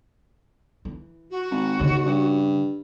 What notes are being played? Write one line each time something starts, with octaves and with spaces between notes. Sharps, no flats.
E3
F#4
G#1
D#2 C#3 C#4
G2